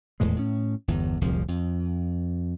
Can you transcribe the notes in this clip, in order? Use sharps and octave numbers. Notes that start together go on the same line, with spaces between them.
D#1 E2 A2 G#3
A2 C#4
G1 E2
D1 C2 F2 F3
F2